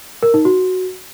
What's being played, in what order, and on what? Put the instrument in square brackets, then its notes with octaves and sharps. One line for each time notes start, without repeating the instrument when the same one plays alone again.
[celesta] A#4
D#4
F#4